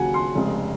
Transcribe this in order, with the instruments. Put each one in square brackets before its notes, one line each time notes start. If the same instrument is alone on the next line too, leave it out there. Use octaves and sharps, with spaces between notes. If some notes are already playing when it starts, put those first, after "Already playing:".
Already playing: [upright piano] D#2 C#3 F#3 F#5 G#5
C6
F1 F2 C#3 G#3